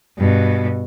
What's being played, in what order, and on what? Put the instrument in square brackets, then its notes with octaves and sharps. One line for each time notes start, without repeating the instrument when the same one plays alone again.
[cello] G2 B2